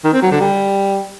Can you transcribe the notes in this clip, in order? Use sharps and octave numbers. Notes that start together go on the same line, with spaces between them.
D#3
C4
F#3
D3
G3